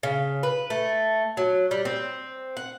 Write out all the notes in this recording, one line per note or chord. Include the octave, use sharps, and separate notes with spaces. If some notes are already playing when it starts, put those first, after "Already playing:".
C#3
B4
A3
F#3
G3
C4
F#5